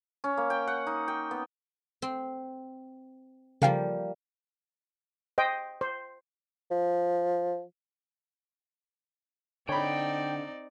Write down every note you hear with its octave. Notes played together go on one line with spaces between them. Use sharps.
C#4
A#3
G5
F#5
D#4
G5
B3
C4
C#3 F3 G3 A#3 F5 G5
C5 D#5 G5
C5
F3
D3 C4 D#4 C#5 D5 G5 B5